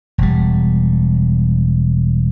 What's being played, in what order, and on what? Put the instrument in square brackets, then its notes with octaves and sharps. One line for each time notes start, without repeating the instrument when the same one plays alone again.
[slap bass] E1 G3